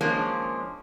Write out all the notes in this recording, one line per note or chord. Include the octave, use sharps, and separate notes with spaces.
F3 G#3 A#3 C#4 D4